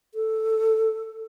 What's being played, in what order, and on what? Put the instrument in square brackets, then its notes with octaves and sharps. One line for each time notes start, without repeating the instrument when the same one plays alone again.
[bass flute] A4